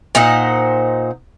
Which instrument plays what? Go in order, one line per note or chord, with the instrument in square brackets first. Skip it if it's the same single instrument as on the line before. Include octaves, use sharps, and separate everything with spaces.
[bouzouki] A#2 D#4 C5 F#5